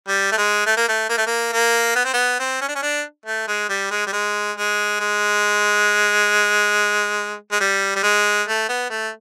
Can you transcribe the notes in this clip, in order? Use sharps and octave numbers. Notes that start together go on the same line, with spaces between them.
G3
A3
G#3
A3
A#3
A3
A#3
A3
A#3
A#3
B3
C4
B3
C4
C#4
D4
C#4
D4
A3
G#3
G3
G#3
G3
G#3
G#3
G#3
G#3
G3
G3
G#3
A3
B3
A3